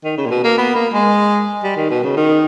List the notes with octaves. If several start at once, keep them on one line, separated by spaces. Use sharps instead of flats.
D#3
C#3
A#2
B2
A#3
B3
A#3
G#3
G3
D#3
B2
C#3
D#3